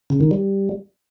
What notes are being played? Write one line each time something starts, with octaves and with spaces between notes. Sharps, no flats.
C#3
D#3
G3